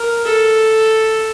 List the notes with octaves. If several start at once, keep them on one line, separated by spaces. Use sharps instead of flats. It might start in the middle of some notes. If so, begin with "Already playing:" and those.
Already playing: A#4
A4